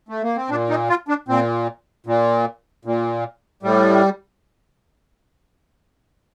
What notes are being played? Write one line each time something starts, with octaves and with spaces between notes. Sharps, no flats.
A3
A#3
C4
A#2 D4
D#4
F4
D4
A#2 C4
A#2
A#2
A2 G3